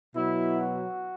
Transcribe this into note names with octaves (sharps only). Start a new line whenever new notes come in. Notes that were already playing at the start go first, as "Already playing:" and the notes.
B2 F#3 E4
F#4